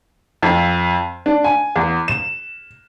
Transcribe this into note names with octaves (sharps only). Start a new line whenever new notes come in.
F2
D4
G#5
E2
E7